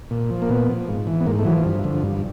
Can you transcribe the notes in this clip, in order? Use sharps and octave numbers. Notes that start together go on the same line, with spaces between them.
A#2
F3
A#3
A#2 B3
F3
G#2
E3
B3
G#2 A#3
A3
E3 F#3
F3
G2
D3 F3
G2